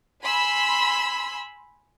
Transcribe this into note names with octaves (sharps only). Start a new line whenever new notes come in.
G#5 B5 C6 E6